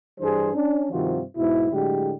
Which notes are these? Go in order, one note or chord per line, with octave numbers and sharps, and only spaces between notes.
G2 E3 G3 D4 G#4 C5
C#4 D4
G2 C3 D#3 F3 F4 F#4
B1 G#2 B2 E4
A2 D3 F#3 G#3 G4